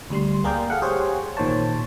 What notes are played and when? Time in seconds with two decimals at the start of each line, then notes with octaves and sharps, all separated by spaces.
0.10 D2 G3 C6
0.44 A#3 G#4 A#4 D5 F5 G5
0.70 G#4 A4 F5 F#5
0.82 G4 G#4 C5 C#5
1.37 A1 A#2 D#3 C5 C#5 A5